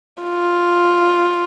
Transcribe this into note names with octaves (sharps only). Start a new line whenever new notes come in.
F4